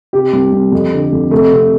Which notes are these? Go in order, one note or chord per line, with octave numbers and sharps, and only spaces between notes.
C3 G4
C2
C2
F2
D3
F2
C3 A3
C3